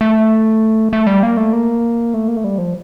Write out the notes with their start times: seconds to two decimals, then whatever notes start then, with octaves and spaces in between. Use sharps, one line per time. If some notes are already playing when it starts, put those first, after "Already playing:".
0.01 A3
0.93 A3
1.07 G3
1.23 A#3
1.37 A3
1.53 A#3
2.14 A3
2.28 A#3
2.37 A3
2.44 G3
2.58 F3